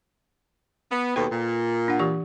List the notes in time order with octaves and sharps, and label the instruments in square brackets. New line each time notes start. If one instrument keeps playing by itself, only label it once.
[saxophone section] B3
[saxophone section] D#2 B2 [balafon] A4 B4 G5
[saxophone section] A#2
[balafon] D4 F#5
E3 G4 C#6